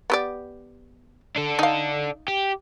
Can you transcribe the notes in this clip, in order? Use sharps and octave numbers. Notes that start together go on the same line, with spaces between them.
B3 G4 D5
D4 A4
D#4 F5
G4